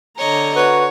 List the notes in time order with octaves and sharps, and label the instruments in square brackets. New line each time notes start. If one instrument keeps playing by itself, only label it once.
[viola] D3 A#5 [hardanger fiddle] C#5 D#5
[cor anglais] F#4 [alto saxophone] B4 [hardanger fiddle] C#5